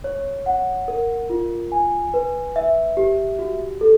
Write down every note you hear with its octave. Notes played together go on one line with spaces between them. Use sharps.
C#5
F#5
A#4
F4
G#5
B4
E5
G4
F#4
A4